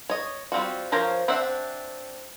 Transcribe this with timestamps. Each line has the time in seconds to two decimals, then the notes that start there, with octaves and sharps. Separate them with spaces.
0.10 C#5 D#5
0.52 G3 C4 F4 F#4
0.92 F3 A#4 C5 C#5 F5
1.28 C4 D4 C5 E5 F#5